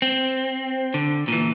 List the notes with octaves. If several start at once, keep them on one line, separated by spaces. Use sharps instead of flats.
C4
D3
A#2 E3